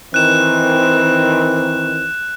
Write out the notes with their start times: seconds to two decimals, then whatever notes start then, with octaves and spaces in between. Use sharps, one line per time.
0.14 D#3 E3 C4 F#6 E7